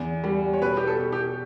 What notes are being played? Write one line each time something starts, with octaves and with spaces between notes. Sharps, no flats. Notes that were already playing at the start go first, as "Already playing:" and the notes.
Already playing: E2
G3
C#5
B2 B4
G4
A4
B2
G4